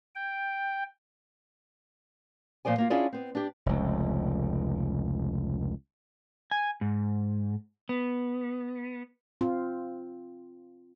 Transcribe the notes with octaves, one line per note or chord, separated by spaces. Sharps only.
G5
A#2 F3 C5 D5 G#5
A#3 F4
C#4 D4 E4 F4 G#4 D5
B3 C4
D4 G4
F1 C#2
G#5
G#2
B3
C4 F4